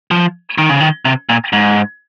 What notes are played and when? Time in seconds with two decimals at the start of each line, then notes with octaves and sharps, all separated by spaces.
0.11 F3
0.58 D#3
0.69 C#3
0.80 D#3
1.05 C3
1.29 A#2
1.53 G#2